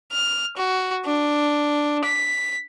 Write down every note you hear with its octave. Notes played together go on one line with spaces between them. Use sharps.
F6
F#4
D4
B6